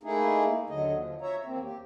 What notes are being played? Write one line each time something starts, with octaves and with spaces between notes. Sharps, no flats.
A3 A#3 D#4 E4 G#4
D#2 D3 F#3 D#5
F3
C#5 E5 A#5
E2 A#3 C4
G4